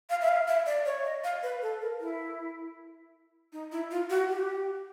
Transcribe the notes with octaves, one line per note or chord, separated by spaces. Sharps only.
F5
E5
F5
E5
D5
C#5
D#5
F5
B4
A4
A#4
E4
D#4
E4
F4
F#4
G4